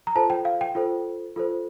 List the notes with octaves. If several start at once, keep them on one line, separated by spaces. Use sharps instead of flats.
A#5
F4 A4 C5 A5
G5
F5
G5
F4 A4 C5
F4 A4 C5